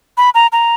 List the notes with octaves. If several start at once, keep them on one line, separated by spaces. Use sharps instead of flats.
B5
A#5
A#5